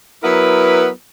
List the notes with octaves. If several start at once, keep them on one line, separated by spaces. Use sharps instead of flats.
F#3 B3 E4 A#4 B4